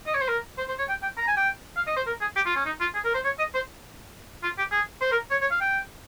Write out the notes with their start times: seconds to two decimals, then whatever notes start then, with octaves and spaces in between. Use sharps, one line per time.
0.07 D#5
0.14 C#5
0.21 C5
0.28 A#4
0.58 C5
0.68 C5
0.79 C#5
0.89 G5
1.03 G5
1.18 A#5
1.27 G#5
1.37 G5
1.77 F5
1.87 D#5
1.97 C5
2.07 A#4
2.21 G#4
2.36 G4
2.46 F4
2.56 C#4
2.65 D#4
2.81 F4
2.94 G#4
3.05 A#4
3.14 C5
3.25 C#5
3.39 D#5
3.54 C5
4.43 F4
4.58 G4
4.72 G#4
5.01 C5
5.12 A#4
5.31 C#5
5.41 C#5
5.51 F5
5.61 G5